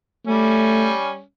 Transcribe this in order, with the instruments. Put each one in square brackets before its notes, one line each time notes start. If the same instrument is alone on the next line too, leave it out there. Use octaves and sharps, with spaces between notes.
[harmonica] G3 C#4 [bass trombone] A3